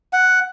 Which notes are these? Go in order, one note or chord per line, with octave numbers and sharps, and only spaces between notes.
F#5